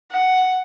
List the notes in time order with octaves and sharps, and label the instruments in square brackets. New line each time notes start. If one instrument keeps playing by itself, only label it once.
[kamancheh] F#5